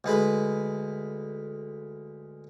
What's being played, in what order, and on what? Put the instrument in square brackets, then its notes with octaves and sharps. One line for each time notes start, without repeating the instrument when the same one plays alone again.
[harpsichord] D2 G#3 B4 B5